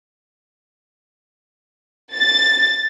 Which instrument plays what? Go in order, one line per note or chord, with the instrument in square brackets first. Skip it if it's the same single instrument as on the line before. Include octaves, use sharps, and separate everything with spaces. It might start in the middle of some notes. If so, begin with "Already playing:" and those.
[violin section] A6